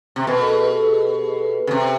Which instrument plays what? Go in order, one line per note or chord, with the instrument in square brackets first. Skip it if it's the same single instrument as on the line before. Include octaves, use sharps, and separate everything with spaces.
[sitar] C3
[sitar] B2 [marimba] A#4
[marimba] A4
G#4
G4
A4
G#4
G4
G4
G#4
A4
B4
[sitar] C#3
C3